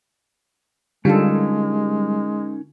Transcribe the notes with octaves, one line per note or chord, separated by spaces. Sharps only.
D3 G3 G#3 C#4 D#4 F4 A4 A#4